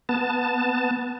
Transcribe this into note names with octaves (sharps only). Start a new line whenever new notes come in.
B3 A5